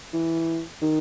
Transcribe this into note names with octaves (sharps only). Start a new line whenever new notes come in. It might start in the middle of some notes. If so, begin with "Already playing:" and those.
E3
D#3